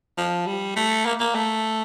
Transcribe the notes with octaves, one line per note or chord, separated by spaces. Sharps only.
F3
G3
A3
A#3
A#3
A3